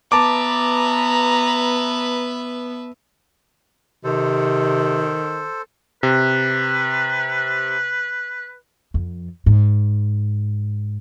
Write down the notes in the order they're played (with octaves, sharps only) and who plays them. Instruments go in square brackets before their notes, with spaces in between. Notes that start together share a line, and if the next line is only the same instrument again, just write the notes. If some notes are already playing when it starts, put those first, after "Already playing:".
[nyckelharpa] B3 [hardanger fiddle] B4 E5 [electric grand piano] A5 D6 [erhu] A#5
[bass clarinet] C3 [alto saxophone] D#3 [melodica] A4 C5
[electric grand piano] C3 [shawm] B4
[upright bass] F2
G#2